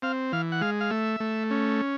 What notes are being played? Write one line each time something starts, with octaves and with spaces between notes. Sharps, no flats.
C4 F5
E3 F5
F#5
G#3 F5
F5
A3 E5
A3
C#4